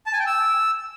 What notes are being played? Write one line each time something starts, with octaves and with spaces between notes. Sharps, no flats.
A5
G#5
G5
E6